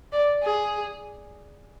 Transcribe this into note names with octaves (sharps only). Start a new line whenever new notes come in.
D5
G#4